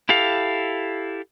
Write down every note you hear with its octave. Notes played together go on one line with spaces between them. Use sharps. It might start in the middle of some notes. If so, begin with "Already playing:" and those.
E4 G4 A4 F5